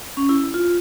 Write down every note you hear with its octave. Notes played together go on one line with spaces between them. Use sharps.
C#4
E4
F4